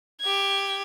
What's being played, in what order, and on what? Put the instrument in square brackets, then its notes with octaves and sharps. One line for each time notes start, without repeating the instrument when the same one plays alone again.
[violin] G4 G#6